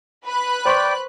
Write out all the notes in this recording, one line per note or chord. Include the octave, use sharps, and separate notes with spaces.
B4 B5 F#6
C5 D5 G5 C6 C#6